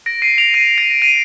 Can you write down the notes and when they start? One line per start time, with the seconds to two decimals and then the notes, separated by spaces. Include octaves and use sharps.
0.06 A#6 D7
0.22 C7 D#7
0.38 D7 F7
0.54 C7 D#7
0.78 A#6 D7
1.02 C7 D#7